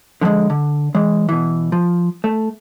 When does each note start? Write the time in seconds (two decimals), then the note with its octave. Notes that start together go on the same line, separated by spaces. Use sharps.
0.21 D3 F3 F#3 G#3
0.50 D3
0.95 E3 G#3
1.29 B2 E3
1.72 F3
2.24 A3